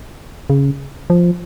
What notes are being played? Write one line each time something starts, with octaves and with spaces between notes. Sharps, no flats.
C#3
F3